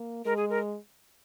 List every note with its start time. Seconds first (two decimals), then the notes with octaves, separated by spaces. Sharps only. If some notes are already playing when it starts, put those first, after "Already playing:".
Already playing: A#3
0.25 G#3 A#4
0.37 G#4
0.50 A#4